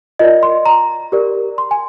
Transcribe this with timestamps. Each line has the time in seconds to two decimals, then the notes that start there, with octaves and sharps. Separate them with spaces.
0.19 F4 A#4 D5 D#5
0.43 C6
0.66 A#5
1.12 G4 A#4 D5
1.58 C6
1.71 G#5